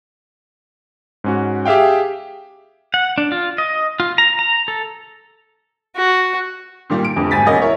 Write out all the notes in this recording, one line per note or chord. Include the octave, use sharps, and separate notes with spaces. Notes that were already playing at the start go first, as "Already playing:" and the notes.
G#2 C#4 F#4
G4 G#4 E5 F5 G5
F#5
D4
F4
D#5
F4
A#5
A#5
A4
F#4
A#2 D#3 G3 A#3
D7
F1 F2 D3
G#1 G#5 A6 B6
E1 A#3 C#4 D#5
E4 A#4 C#5